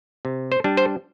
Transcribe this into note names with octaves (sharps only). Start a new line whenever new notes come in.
C3
C5
G3 D4
C5